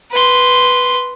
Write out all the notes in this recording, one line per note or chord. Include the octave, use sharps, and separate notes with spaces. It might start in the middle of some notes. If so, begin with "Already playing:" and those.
B4 C6